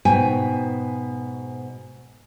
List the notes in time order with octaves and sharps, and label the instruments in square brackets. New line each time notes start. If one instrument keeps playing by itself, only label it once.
[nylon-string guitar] G#2 B2 G5 G#5